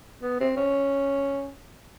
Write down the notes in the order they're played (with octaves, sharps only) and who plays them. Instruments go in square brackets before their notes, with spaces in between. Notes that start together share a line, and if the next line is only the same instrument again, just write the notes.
[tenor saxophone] B3
C4
C#4